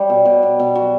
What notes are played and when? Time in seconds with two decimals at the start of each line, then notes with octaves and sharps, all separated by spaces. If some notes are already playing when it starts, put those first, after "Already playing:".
Already playing: G3 C#5
0.10 B2
0.25 B2
0.43 B2
0.59 B2
0.75 F#3